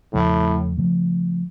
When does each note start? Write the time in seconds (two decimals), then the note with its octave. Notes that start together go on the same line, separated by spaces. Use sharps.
0.13 E2 A2 C#3 F3 A3
0.77 C#3 F3 A3